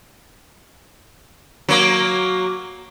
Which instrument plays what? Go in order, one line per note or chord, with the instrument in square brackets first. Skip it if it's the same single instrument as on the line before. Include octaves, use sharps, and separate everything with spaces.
[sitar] F#3 A#3